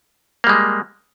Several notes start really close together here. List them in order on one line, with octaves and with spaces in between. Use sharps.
A#3 G3 G#3